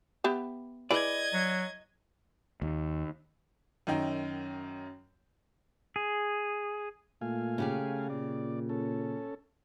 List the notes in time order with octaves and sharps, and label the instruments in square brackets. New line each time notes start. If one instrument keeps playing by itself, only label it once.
[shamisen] B3 G4 E5
[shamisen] E4 G#4 B4 [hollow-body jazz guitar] D5 [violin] D#5 G#6
[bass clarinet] F#3
[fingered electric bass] D#2
[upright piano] F#2 D#3 D#4 G5
[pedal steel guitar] G#4
[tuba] A#2 [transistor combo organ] A3 F5 G#5
[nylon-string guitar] C#3 G4 G#4
[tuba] A#2 [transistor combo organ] D5
[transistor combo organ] C#4 A4